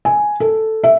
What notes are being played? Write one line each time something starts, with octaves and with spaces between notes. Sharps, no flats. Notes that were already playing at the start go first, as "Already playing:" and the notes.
G#5
A4
E5